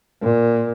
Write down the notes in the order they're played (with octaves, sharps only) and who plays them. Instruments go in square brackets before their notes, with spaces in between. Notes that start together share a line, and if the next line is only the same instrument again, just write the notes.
[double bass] A#2